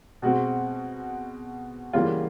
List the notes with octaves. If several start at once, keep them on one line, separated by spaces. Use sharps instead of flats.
B2 G#3 C4 F#4
C#3 E3 G3 A#3 F4